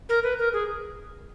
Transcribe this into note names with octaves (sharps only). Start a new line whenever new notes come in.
A#4
B4
A#4
G#4